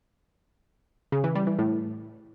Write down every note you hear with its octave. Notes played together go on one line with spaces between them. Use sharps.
C#3
E3
G3
E3
A2